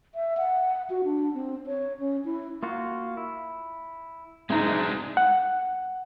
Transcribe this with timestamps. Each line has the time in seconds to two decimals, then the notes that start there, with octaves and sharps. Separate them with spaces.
0.15 E5
0.37 F#5
0.90 F#4
1.04 D4
1.34 C4
1.67 C#5
1.99 C#4
2.25 E4
2.63 A#3 F4 F#4
3.17 E4
4.50 F#1 G#2 G#3 C4 D4 D#4 A#5
5.17 F#5